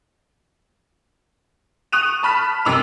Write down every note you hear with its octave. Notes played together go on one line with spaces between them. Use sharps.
C#6 D#6 F#6 D#7 F7
A5 B5 F6 B6
F#2 C3 D6 E6 F7